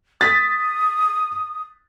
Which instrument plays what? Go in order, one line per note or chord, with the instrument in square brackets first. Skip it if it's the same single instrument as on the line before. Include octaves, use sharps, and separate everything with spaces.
[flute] D#6 [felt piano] A6 B6